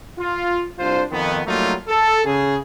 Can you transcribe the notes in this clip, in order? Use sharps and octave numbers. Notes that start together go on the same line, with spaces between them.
F4
C2 D4 F4 C5
F2 D#3 B3
F#3 G3 A3 A#3 D#4 F4
A4
C#3 G#4